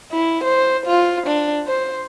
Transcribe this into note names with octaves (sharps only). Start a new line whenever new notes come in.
E4
C5
F4
D4
C5